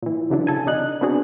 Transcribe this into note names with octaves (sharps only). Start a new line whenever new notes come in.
A#2 E3
C#3 E3 F#3 D4
C#3 A4 G#5
C3 D4 D#4 F#6
B3 C4 D4 F#4 G#4